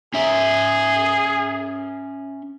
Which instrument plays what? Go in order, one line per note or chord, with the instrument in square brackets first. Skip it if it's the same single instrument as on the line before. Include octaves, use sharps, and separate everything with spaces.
[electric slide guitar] C#4 E5 [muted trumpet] G#4